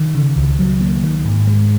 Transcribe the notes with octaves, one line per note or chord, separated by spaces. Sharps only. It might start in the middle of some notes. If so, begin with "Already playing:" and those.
Already playing: D#3
C#3
C#2
F#3
A#3
D#3
G#2
G#3